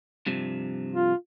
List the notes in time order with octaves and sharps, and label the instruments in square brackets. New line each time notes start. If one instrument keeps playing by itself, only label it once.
[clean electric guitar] G2 C3 F3
[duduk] F4